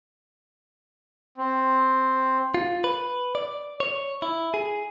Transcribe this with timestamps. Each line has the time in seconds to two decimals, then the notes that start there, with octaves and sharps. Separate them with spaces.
1.38 C4
2.54 F4
2.84 B4
3.35 D5
3.80 C#5
4.22 E4
4.54 G#4